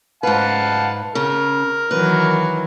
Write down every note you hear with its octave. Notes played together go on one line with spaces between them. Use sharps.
G#2 B4 F5 F#5 A5
C#3 A#4
D#3 E3 F#3 B4